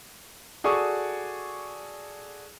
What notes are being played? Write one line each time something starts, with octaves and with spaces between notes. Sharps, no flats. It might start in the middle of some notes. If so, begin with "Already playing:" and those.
F#4 G#4 A4 D5 C#6 D#6